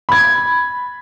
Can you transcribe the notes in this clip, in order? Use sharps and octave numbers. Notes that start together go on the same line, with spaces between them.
B5 G#6